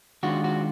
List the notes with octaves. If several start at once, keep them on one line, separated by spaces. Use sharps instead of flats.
D#3 G#3 D4 F4 F#4
F#4